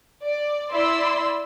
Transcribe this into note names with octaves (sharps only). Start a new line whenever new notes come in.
D5
E4 D5 C6 E6